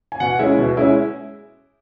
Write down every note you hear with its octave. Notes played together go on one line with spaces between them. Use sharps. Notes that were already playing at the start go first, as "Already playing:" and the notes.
G#5
B2 F#5
G#3 C#4 E4 E5
B2
G#3 C#4 E4